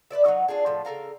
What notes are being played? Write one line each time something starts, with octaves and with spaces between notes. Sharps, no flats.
B4 C5 D5 E5
F#3 A3 D#4 F#4
G#3 D4 F4 G#4
A2 F3 A4
C#3 A4 A#4 F5